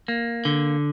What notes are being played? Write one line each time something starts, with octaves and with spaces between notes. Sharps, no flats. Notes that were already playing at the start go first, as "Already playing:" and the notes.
A#3
D3